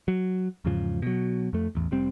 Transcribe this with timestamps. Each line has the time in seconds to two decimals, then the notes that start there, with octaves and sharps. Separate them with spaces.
0.08 F#3
0.65 E2 G#2 C#3 F3
1.02 B2 F#3
1.53 F2 A3
1.75 A1 E2
1.91 F1 G3 C4